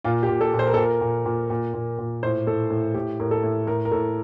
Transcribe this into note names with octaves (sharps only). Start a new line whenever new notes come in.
A#2 F4
G4
A#2
A4
A#2
C5
A#4
A4
A#2
A#4
A#2
A#2
A#2
A#2
A#2
A2 C5
A2 A4
A2
A2 G4
A2 A#4
A4
A2
A2 A#4
A#4
A2 A4